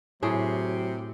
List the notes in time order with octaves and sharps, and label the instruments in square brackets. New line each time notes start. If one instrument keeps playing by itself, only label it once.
[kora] A2 G#4 G5 [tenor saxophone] C3 [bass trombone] F#3